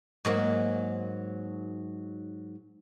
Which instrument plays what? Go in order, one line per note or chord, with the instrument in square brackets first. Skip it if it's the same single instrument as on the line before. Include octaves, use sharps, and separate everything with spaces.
[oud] G#2 F#3 A#3